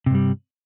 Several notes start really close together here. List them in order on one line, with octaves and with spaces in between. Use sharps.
C3 G2 G3